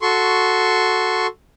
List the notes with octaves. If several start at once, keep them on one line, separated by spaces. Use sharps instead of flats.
F#4 A4 C6 C#6